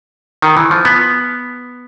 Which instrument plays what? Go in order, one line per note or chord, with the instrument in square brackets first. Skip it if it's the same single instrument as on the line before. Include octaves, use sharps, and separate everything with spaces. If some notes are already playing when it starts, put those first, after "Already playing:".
[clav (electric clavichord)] D#3
E3
F3
B3